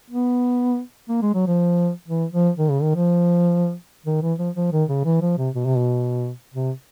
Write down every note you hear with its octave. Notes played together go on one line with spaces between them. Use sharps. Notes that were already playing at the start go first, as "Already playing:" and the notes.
B3
A#3
G#3
F#3
F3
E3
F3
D#3
C#3
D#3
F3
D#3
E3
F3
F3
D#3
C#3
E3
F3
C3
B2
C3
B2
C3